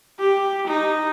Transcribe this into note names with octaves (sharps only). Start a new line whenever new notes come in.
G4
D#4